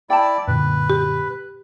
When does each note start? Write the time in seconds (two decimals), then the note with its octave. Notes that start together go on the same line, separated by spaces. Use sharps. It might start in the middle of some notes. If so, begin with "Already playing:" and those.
0.10 E4 D5 G5 A5
0.47 F#2 A#2 D3 B4
0.90 G4